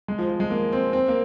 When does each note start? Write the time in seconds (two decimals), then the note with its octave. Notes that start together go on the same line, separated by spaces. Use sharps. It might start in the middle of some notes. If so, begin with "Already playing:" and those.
0.08 G#3
0.19 F3
0.30 F3
0.40 G#3
0.50 A#3
0.72 C4
0.93 C4
1.08 A#3